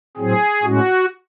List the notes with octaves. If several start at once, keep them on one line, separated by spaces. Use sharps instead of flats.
A2 F#3 C4 G#4
A2 G#3 C#4 F#4